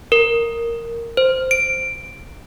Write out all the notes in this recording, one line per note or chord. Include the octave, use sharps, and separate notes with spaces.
A#4
C5
D7